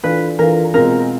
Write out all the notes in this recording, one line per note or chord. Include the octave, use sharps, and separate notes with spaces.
E3 A3 D4 F4 B4
E3 A3 D4 F4 A#4
B2 G#3 C4 F4 A#4